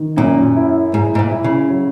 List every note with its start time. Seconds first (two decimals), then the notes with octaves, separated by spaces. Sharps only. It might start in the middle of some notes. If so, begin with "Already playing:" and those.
Already playing: D#3
0.17 F#2 A#2
0.56 E4
0.93 G#2 E4
1.15 G#2
1.19 A#2
1.31 E4
1.44 C#3
1.70 F#3